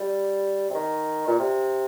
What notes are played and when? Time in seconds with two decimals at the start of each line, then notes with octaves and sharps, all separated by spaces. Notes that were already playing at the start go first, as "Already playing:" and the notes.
Already playing: G3
0.70 C3
0.74 D#3
1.27 A#2
1.39 C3